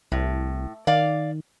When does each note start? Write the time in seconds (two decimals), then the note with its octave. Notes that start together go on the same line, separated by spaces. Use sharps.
0.12 C2 A2
0.87 D#3 D5 F5